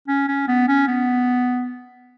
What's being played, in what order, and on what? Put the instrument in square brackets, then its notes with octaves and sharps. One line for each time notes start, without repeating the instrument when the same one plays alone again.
[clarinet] C#4
C#4
B3
C#4
B3